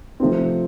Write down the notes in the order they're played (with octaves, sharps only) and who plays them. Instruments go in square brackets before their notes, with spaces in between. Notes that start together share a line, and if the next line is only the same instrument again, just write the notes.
[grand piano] C3 F3 A3 C4